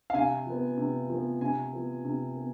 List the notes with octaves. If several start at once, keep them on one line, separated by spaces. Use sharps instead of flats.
F5
C3 G#5
F3 B3
C3
F3 B3
C3 G#5
F3 B3
C3
B3